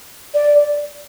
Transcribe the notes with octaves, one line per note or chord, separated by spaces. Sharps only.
D5